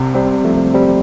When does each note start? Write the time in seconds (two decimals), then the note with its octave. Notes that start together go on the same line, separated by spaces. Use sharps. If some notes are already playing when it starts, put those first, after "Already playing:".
Already playing: C2 C3
0.15 G3 C4
0.45 F3 A3
0.74 G3 C4